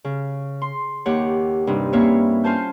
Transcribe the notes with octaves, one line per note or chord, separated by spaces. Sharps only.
C#3
C6
D#2 G4 C#5 F#5
G2 C3 D#4
A#3 C4 C#4 E4 C#5 E5
C#4 F4 C5 G#5 A5 G6